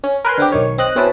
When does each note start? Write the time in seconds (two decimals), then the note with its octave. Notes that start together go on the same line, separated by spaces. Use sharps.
0.04 C#4
0.25 A#4 B4 G#5 C6
0.38 D3 C4 G4
0.52 B1 D#3 C#5
0.78 C4 D#5 F#6
0.95 B2 C4 C#4 E4 B4 A5